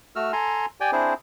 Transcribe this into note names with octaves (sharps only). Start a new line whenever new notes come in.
A3 F#4 E6 F6
A4 G#5 A#5 C6
G4 D5 G5 G#5
C4 D4 E4 G#4 C5